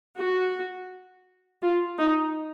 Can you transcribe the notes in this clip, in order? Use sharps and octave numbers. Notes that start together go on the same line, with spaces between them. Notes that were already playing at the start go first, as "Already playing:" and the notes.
F#4
F4
D#4